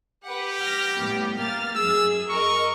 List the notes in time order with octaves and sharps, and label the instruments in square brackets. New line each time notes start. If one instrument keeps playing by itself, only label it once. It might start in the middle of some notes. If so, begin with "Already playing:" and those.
[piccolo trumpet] G4 [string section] B4 F#5
[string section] F6 A#6
A2 G3 B3
A#3 F6 A6
[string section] F#2 G#4 [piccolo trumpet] E6
[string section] A#4 D#5 [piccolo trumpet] C#6